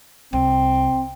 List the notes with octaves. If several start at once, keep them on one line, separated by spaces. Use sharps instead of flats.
C2 C4